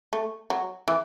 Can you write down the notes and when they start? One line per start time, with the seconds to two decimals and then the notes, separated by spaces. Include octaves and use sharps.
0.13 A3
0.50 F#3
0.88 E3